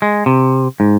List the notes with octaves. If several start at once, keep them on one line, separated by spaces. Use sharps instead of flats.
G#3
C3
G#2